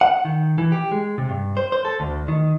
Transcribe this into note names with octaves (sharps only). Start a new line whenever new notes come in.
F#5
D#3
E3
G4
G#3
C3
G2
C5
C5
A4
D2
D#3